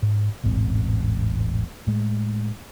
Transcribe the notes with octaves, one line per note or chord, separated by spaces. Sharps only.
G#2
E1 A1 G#2 C4
A2 G#3